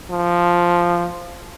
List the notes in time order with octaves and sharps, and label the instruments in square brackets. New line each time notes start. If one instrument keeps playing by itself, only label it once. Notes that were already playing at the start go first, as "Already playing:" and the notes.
[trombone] F3